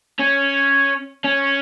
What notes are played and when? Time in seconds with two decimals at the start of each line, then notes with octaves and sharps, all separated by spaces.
0.20 C#4
1.24 C#4